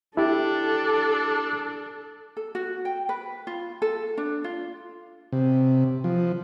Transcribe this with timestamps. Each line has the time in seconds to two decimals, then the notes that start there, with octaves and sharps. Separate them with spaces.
0.17 D4 E4 G4 A4
2.37 A4
2.55 F#4
2.85 G5
3.09 B4
3.47 F4
3.82 A4
4.18 D4
4.44 F4
5.33 C3
6.04 F3